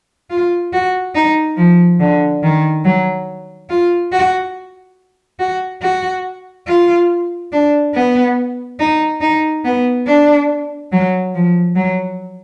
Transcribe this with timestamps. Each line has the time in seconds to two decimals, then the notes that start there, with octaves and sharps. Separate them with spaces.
0.30 F4
0.73 F#4
1.15 D#4
1.57 F3
2.00 D3
2.43 D#3
2.85 F#3
3.69 F4
4.12 F#4
5.39 F#4
5.82 F#4
6.67 F4
7.52 D4
7.94 B3
8.79 D#4
9.21 D#4
9.64 B3
10.07 D4
10.92 F#3
11.34 F3
11.75 F#3